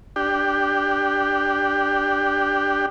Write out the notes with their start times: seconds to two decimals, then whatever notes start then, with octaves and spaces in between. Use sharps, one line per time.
0.16 D4 G4